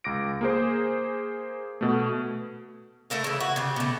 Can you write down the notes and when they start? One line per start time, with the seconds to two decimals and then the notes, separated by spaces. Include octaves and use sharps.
0.04 C#2 D6 A#6 D7
0.41 A#3 G#4 C5
1.81 B2 A3
3.10 A3 E4 A#4 F5
3.24 C#3 E3
3.40 F#4
3.56 C#3 G4
3.76 B2 A3